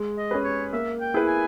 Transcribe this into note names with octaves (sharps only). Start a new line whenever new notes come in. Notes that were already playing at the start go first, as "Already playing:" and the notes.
Already playing: G#3
D#5
C#4 G#4 B4
C#5
A#3 E5
G5
E4 G#4 B4
G#5